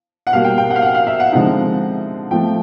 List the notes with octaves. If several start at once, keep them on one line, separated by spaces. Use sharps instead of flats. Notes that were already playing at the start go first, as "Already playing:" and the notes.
F#5
B2 G3 A#3 F5
G5
G5
F#5
F5
F#5
F5
E5
F#5
D3 F3 G#3 C4 D#4 F#5
F3 A3 C4 E4 G5